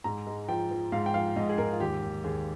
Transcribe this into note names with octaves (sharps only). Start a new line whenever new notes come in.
G#2 A#5
G#3
F3 G5
F3
G#2 F5
G5
F3 F5
G#2 D#5
G#4
G#2 A#4
F4
D#2 G4
D#2
D#2 G#4